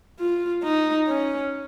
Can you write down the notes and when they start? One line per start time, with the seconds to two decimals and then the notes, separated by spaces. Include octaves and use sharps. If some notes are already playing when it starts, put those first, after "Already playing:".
0.19 F4
0.63 D#4
1.08 C#4